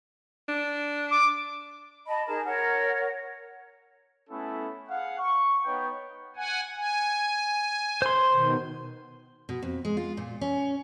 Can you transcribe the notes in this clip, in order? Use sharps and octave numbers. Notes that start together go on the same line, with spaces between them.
D4
D6
D#5 A5 B5
D#4 G#4 A#4 A5
A#4 C#5 F#5
A3 B3 C#4 E4 A4
G#4 F5 F#5
C#6
B3 D#4 B4 C#5 G5
F#5 G#5
G#5
C5 C6
B2 D#3
B2
F2
G#3
F4
A#2
C#4